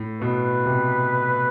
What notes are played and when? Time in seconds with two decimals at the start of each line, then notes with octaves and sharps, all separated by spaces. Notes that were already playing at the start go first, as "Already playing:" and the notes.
Already playing: A2
0.21 B2 B4
0.66 C3